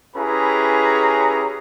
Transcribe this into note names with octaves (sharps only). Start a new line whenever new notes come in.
C#4 E4 G4 G#4 B4 A#5